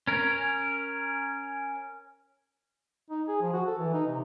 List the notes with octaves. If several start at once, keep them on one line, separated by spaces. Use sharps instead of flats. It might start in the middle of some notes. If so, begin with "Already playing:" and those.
C#4 A#4
D#4
G#4
F3
F#4
A4
E3
D#4
C3